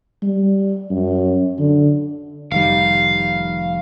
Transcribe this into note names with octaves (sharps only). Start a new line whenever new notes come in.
G3
F#2
D3
F1 D#3 G3 F5